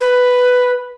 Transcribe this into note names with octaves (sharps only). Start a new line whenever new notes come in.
B4